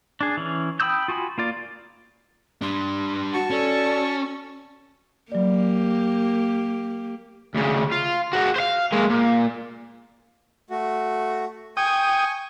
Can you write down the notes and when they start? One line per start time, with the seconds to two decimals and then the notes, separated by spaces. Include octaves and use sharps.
0.21 D4 G#4
0.37 E3 C#4
0.80 G5 B5 D#6 E6 G6
1.08 F4 F#4 G#5 B5
1.38 A#3 F4 D5
2.62 G3 D4 C6
3.33 F#4 F#5 A5 C#6
3.50 C#4 A4 D5
5.32 F#3 A#3 G4 D5
7.54 D2 C#3
7.91 F4
8.33 G#3 F#4
8.56 C5 F5
8.93 G#3 A#3
9.10 A#2
10.70 A3 F#4
11.77 G5 G#5 C#6 D#6